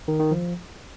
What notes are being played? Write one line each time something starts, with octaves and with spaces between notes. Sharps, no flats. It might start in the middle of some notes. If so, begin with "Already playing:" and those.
D#3
D#3
F3